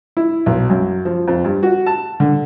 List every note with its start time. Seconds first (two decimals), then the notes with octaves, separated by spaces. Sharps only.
0.17 E4
0.46 B1
0.70 F#2
1.05 F3
1.28 F2
1.44 G2
1.63 F#4
1.86 A5
2.20 D3